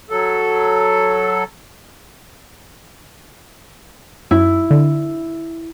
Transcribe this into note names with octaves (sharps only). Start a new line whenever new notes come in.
F#3 A4
F#2 E4
D3